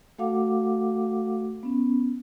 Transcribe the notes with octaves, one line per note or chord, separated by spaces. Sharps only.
A3 F#4 A4 F5 F#5 D6
B3 C#4